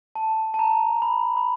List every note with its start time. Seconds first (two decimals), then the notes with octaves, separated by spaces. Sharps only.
0.15 A5
0.54 A5
0.59 A#5
1.02 B5
1.37 B5